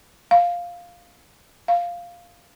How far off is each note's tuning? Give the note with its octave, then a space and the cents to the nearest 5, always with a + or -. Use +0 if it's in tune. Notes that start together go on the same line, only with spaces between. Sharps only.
F5 +5
F5 +0